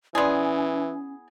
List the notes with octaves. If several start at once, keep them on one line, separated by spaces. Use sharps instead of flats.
E3 B3 C#4 E4 G#4 D5 C6